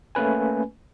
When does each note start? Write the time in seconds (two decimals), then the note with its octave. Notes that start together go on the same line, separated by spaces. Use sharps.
0.15 A3 A#3 C#4 B4 G#5